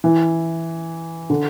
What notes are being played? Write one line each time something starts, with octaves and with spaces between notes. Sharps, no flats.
E3
D3